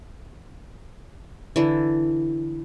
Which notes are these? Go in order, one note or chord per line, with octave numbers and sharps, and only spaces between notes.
D3 E3